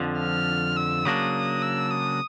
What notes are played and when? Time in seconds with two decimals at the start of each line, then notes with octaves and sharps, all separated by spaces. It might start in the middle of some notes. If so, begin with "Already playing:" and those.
Already playing: F2 D3 F3
0.19 F6
0.77 E6
1.05 C#3 F#3 A#3 D4 D#6
1.62 E6
1.91 D#6